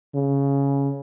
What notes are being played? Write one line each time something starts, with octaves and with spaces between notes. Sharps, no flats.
C#3